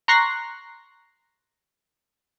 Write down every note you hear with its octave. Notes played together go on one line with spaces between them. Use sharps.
A#5 C6 C#6 F#6 A#6 C7